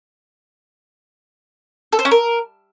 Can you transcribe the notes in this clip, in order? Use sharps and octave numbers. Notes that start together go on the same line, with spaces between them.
A4
C5
C#4
A#4